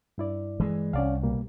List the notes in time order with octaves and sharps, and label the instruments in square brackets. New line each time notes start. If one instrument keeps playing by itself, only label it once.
[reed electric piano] G2 E4 D5
[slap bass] E3 G#3
[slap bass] C2 [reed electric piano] C#4 D5 F5
[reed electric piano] B2 G3 A#3